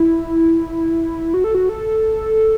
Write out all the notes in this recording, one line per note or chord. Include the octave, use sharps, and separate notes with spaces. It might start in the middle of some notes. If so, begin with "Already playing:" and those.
Already playing: E4
F#4
A4
F#4
A4